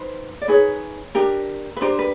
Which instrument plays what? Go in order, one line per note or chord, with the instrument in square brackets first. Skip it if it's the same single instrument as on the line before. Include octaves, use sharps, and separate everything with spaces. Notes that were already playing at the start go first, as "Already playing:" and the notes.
Already playing: [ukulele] D#4 B4 C5
D5
D#4 G#4 B4 C#5
D4 G4 A#4
B4
D4 G4 A#4 C5
B4